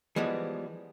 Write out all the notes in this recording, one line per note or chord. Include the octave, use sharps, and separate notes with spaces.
E3 F3 G3 G#3 B3